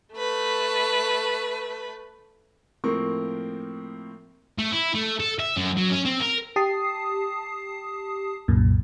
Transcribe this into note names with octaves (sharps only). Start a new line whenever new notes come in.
A3 B4
A2 F3 A#3 C4 A#4 C#6
A3
E4
A3
A4
E5
F#2
F#3
C#4
C4
A#4
G4 A5 D#6 C7
C2 F#2 A#2